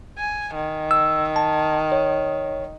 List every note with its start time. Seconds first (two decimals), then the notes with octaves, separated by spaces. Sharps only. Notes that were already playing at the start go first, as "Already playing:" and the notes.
0.18 G#5
0.55 D#3
0.91 E6
1.36 A5
1.92 C#5